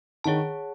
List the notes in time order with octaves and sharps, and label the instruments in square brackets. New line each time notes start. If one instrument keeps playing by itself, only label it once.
[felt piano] D#3 [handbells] G#4 C#5 F#5 A5